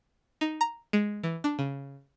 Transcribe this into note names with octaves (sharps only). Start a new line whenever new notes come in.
D#4
A#5
G#3
E3
D4
C#3